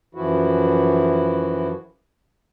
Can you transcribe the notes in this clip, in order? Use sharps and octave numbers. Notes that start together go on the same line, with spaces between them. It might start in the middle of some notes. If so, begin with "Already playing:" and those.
F#2 E3 F3 E4 F#4